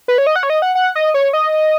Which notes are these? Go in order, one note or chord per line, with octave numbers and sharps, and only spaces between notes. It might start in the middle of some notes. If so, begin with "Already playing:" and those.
B4
C#5
D#5
F#5
C#5
D#5
F#5
F#5
D#5
C#5
D#5